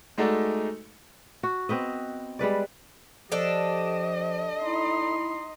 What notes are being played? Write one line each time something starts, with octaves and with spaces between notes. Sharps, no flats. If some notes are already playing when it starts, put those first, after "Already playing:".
G#3 A3 D#4 F#4 A4 D5
F#4
B3 C4 B4 D#5
G3 G#3 B4 D5
F3 D4 G4 A4 D#5
D#4 E4 C6